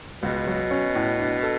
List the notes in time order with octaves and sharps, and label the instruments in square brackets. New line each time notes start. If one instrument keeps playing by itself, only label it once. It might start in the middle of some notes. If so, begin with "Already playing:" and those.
[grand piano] C#2 [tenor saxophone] B2
[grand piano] F#3
C#4
A2
D4
A4